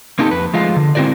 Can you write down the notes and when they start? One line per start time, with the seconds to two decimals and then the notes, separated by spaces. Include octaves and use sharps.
0.19 A#3 C4 D#4 G4 A4
0.31 F2 B4
0.54 F3 G#3 A3 F4
0.76 D3
0.95 G#3 C4 E4 F#4 A#4 D5